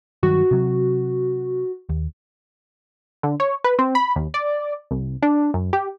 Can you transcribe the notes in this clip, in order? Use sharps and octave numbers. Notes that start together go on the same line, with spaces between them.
G2 D#3 F#3 F#4
C3 F#3
D#2
D3
C#5
B4
C4
B5
D#2
D5
C2
D4
F#2
G4